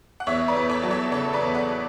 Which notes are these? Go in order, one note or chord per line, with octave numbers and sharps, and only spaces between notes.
F#5
E2 C#5 E5
B4 D5
E2
A4 C#5
F#3
A4 C#5
C#3 A4 C#5
B4 D5
E2
D5 F#5